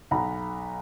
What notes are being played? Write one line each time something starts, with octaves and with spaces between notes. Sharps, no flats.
B1 F#5 A#5 B5